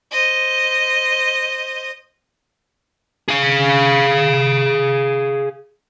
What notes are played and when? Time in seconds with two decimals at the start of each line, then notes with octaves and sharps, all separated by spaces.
0.11 C5 D#5
3.29 G#4 F5